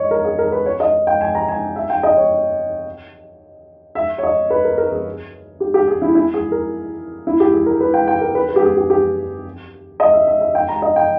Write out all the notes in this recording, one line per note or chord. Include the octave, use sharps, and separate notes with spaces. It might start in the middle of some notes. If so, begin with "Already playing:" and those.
Already playing: C#5 D#5
A#4
G#4
A#4
B4
C#5
D#5
G5
G#5
A#5
G#5
E5
G5
D#5
C#5
E5
C#5
D#5
B4
A#4
A#4
G#4
G4
G4
G#4
E4
E4
G#4
A#4
E4
G4
G#4
A#4
B4
G5
G5
A#4
B4
B4
G4
G#4
G4
G4
D#5
E5
E5
E5
G5
A#5
D#5
G5